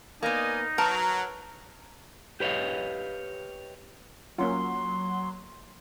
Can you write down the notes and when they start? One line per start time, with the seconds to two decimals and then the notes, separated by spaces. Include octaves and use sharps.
0.23 A#3 B3 D#4 D5 D#5 G#5
0.78 F#3 A#4 B4 A5
2.40 G4 B4 C#5 D#5 F5
4.38 F#3 A#3 C#4 F4 C6